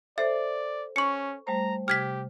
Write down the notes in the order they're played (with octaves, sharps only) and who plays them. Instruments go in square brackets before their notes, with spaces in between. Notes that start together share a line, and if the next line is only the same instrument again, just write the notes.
[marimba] A4 C5 [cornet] D5 [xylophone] E5
[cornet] C#4 [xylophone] C#6 C#7
[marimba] G3 A3 C5 [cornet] A#5
[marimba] C3 [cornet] G4 [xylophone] F6 G#6 B6